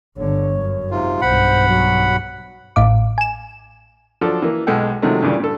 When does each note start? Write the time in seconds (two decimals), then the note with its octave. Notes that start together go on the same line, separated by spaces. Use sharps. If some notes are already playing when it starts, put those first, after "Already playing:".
0.17 G1 D3 C#5
0.58 F#2
0.91 G#2 C3 F4
1.21 B1 G2 C5 F#5 B5
1.69 F#3
2.76 A1 A2 F5 D6
3.18 G#5 E7
4.21 F3 F#3 D4 A4
4.42 E3 A#3
4.67 B1 G#3 A4 F#5 G5
5.02 C3 D#3 F3 F#3 G#3 A3
5.22 G2 A#2 C#3 E3 G3
5.40 G2 A4